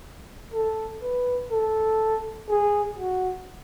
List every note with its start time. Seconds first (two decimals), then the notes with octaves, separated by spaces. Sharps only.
0.54 A4
1.02 B4
1.51 A4
2.49 G#4
2.97 F#4